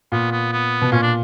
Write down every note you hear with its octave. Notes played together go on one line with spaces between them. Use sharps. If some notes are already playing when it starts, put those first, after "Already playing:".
A#2 B3
B3
B3
B2
A#2 C#4
D4